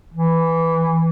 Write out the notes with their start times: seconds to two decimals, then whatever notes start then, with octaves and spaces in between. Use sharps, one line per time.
0.14 E3